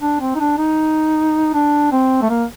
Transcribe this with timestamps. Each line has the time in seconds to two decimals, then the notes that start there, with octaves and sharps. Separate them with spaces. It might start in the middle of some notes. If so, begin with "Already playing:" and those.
0.01 D4
0.20 C4
0.35 D#4
0.40 D4
0.58 D#4
1.54 D4
1.91 C4
2.22 A3
2.29 A#3